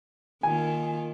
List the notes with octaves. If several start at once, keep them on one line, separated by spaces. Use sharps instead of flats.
D#3 A#3 F4 G#5